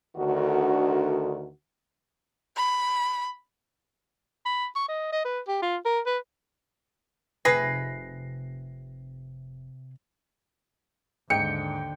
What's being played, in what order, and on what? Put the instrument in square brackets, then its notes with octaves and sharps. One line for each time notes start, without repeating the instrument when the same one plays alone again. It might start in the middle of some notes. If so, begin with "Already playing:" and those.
[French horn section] D2 D3 D#3 F#4
[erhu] B5
[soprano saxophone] B5
C#6
D#5
D#5
B4
G4
F4
A#4
B4
[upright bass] F1 [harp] C3 E5 [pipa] G#4 B4 [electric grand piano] A#6 C7
[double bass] D#2 D3 [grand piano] G#2 [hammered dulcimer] G5 [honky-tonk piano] C#7